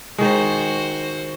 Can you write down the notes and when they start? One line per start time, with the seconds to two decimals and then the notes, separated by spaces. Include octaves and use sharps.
0.18 D#3 G#3 F#4 C5